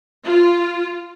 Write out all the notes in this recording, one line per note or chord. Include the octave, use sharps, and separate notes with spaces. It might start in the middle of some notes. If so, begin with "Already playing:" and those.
F4